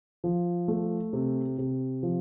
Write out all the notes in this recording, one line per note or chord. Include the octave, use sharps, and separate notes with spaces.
F3
A3
C3
C3
F3